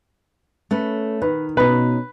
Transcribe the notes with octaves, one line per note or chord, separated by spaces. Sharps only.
A3 C#4 B4
D#3 B4
B2 C#4 D#4 B4